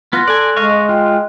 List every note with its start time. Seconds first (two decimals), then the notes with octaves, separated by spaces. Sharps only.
0.13 B3 F4 C6 F#6 A#6
0.28 A4 D5 G#5 F#6
0.56 G#3 D#5 F5 C#6
0.89 F4 G5